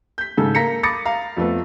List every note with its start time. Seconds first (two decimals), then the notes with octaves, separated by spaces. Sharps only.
0.18 G6 B6
0.37 G#2 C#3 A4
0.55 A#3 A#5 A#6 B6 C#7
0.83 B5 D6 D#6 A6 A#6 C#7
1.05 F5 A#5
1.37 F2 F3 A3 B3